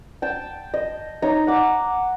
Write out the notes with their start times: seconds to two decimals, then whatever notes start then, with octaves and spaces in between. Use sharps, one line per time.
0.22 G5 A5
0.74 D#5
1.22 D#4 C#5 A#5
1.47 F#5 D6